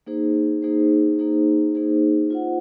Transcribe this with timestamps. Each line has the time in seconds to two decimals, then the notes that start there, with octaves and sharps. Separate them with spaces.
0.07 A#3 D#4 G#4 C5
0.62 A#3 D#4 G#4 C5
1.19 A#3 D#4 G#4 C5
1.75 A#3 D#4 G#4 C5
2.30 F4 C5 F#5